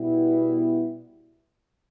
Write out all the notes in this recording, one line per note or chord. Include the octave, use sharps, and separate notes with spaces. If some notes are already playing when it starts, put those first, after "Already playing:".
Already playing: B2 G3 B3 E4